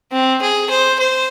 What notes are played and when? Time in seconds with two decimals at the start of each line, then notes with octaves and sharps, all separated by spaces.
0.12 C4
0.42 G#4
0.70 C5
0.99 C5